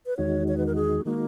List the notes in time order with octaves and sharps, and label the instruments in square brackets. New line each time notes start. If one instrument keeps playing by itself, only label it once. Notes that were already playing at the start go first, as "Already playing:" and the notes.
[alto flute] B4
[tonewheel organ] E2 D#3 G#3 D#4 F#4 [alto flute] C#5
[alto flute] C#5
B4
A#4
G#4
[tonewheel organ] D#3 G#3 D#4 F#4 [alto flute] A#3